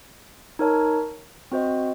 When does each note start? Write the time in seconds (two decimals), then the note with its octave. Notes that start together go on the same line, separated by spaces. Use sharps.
0.59 D#4 A#4 C#5 A5
1.52 C4 F#4 C5 D#5